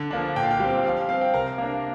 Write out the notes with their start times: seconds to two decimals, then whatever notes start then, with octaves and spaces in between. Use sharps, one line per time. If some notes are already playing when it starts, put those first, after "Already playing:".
Already playing: D3
0.11 F3 A#3 D4
0.36 A#2 G5
0.43 F5
0.51 G5
0.60 G3 C4
0.84 F3 F5
0.97 F5
1.09 C4 F5
1.21 G5
1.34 C3 A#4 A#5
1.58 A#3 D4